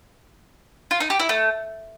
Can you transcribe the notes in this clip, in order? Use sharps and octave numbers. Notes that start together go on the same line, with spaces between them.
F4
D#4
G4
E4
A3